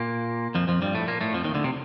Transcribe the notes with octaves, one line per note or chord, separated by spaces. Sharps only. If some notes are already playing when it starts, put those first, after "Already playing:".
Already playing: A#2 A#3
F2 F3
F2 F3
G2 G3
A2 A3
A#2 A#3
A2 A3
F2 F3
D#2 D#3
D2 D3
C3